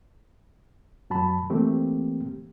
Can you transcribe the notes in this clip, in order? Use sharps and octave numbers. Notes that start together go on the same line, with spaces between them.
F#2 F#3 A5 B5
E3 A3 A#3 C4 G4